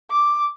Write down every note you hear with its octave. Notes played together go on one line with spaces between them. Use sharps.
D6